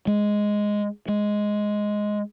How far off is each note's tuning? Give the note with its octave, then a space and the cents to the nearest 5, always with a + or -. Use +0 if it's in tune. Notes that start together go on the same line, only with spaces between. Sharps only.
G#3 +0
G#3 +5